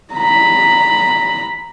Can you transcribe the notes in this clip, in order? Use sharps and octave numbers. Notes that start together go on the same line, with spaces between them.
A#5 B5